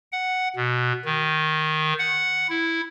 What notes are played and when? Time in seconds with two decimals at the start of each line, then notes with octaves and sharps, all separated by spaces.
0.12 F#5
0.56 B2
1.05 D#3
1.99 F#5
2.49 E4